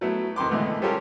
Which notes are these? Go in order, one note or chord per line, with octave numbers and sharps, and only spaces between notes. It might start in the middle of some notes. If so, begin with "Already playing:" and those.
F#3 A3 B3 E4
F2 D#3 C6 D6
D3 E3 G#3 A3 B3
G3 C#4 F4 G4 A4 A#4